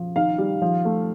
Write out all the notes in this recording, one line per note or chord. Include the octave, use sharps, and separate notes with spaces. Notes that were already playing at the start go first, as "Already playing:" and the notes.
Already playing: F3
D#3 F5
G3
F3
A3